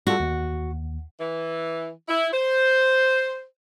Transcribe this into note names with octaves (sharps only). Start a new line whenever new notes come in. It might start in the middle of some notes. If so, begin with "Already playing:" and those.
G3 F4 F#4 A4
D#2
E3
E4
C5